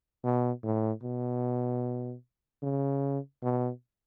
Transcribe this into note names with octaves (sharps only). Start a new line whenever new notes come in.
B2
A2
B2
C#3
B2